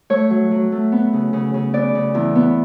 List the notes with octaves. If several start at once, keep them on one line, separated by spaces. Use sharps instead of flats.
A3 C#5
F#3
F#3
A3
B3
C#3
C#3
C#3
B3 D5
C#3
E2
B3